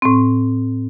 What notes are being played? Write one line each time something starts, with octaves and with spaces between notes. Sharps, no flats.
A2 C4